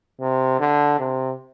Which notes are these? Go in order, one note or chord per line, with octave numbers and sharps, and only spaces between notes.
C3
D3
C3